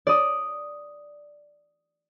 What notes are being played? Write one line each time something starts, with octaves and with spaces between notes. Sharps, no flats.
D5 D#6